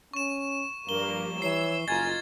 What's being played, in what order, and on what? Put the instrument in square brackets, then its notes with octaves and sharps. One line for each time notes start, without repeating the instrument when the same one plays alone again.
[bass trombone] C#4 [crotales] C#6 E7
[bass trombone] G2 [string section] F3 G3 A#3 [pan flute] A#4 [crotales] G7
[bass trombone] E3 [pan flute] C#5 [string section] E6 [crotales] C7
[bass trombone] F#1 [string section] F4 A#4 D#5 [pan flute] G#5 [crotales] G#6 A6